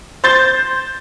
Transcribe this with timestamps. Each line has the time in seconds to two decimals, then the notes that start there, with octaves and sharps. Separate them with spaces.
0.24 C5 G6 A6